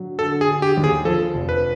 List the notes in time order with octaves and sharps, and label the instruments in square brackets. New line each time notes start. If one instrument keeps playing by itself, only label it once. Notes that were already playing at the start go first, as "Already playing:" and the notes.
Already playing: [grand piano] D3 F#3
[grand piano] D3 [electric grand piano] A4
[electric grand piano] G#4
[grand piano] D3
[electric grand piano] G4
[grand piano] D#2
[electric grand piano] G#4
[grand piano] F3 [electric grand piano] A4
[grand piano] F1
[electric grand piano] B4